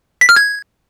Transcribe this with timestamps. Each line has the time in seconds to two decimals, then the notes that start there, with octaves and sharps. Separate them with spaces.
0.21 B6
0.29 F6
0.36 G#6